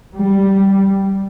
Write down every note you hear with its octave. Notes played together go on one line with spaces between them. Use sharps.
G3